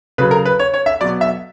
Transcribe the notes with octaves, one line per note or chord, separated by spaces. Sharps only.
C#3 F#3 B4
A#4
B4
C#5
C#5
E5
B2 F#3 D5
E5